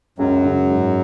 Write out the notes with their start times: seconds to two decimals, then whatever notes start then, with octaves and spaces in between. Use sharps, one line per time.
0.18 C#2 F#2 F#3
0.45 C#3 G#3
0.69 G#2